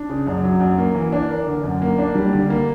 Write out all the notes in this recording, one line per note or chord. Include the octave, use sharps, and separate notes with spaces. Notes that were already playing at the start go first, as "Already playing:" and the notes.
Already playing: D4
C#3
F#2
F#3
F#2
A#3
E3
D4
A#4
D3
F#2
A#3
D4
G3
D3
A#3